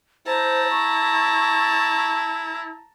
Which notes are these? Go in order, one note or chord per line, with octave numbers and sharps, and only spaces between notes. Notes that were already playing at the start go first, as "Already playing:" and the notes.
E4 C5 A5 A#5
C#6